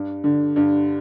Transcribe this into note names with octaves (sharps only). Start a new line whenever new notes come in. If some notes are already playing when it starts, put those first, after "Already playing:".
Already playing: G2
D3
G2